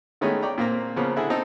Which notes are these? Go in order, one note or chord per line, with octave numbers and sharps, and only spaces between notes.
D#3 G#3 A3 B3 C#4 D#4
C#5 D5 G5 A#5
A#2 A#3 C4 A#5
C#3 F3 A#3 B3
D3 E4 G#4
C4 D#4 A4